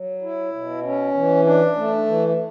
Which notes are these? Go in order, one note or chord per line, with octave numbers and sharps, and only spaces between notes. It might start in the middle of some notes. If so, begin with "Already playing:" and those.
Already playing: F#3
E4
B2
C#4
E3
D4
A3
E3